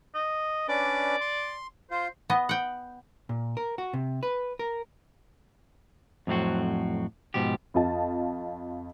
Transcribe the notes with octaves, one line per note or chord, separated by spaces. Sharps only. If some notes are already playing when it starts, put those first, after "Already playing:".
D#5
C#4 D4 B4 D5
C6
F4 C5
B3 D#5
F#5 G5
A#2
A#4
F#4
C3
B4
A#4
F2 A2 F#3 C4 F#4
G#2 B2 F3 G4
F2 F4 D#5 A5